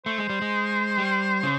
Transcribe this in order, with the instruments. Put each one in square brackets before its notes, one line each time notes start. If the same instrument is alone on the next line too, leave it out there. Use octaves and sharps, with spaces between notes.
[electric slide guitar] A3 [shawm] C5
[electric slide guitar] G#3
G3
G#3
G3
C#3